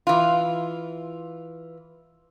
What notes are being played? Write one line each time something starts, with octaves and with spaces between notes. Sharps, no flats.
E3 F4